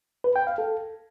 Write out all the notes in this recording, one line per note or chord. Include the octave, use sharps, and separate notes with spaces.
B4
G5
F5
A4